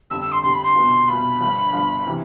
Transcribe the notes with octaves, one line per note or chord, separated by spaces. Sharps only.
G1 F2 D3 G3 E6
E6
C6
G1 F2 D3 G3 C6
B5
C6
C2 B2 B3 F4
C2 B2 B3 F4 B5
G1 G2 F3
G1 G2 F3
C3 E3